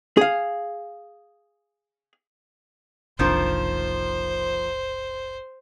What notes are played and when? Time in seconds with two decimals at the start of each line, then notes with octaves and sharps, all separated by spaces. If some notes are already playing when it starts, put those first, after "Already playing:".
0.17 G#4 F5
3.19 F#1 C2 D#3 F3 A#3 D4 C5